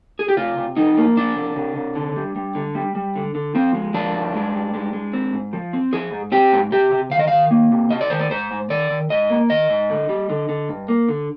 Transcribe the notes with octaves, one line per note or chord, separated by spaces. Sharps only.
G#4
G4
C3 F4
C3
F3 D#4
A#3
F3 D4
C3
C3
C3
D3
G3
G3
D3
G3
G3
D3
D3
F3 C4
G#3
F3 D4
G2
G#3
G2
G#3
G#3
C4
G#2
F3
C4
F3 G#4
G#2
C4 G4
G#2
C3 G4
C3
D#3 F5
D#5
D#3 F5
A#3
C3
C3 D#5
D5
D#3 C5
D5
G#2 C5
G#2
D#3 D5
D#3
G#2 D#5
A#3
D#3 D#5
G#2
D3
G3
D3
D3
G2
A#3
D3